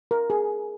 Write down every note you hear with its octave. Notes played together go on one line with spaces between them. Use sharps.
A#4
G#4